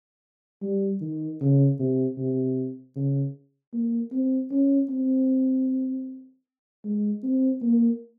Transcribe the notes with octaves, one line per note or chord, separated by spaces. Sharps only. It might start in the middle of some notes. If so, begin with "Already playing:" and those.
G3
D#3
C#3
C3
C3
C#3
A#3
C4
C#4
C4
G#3
C4
A#3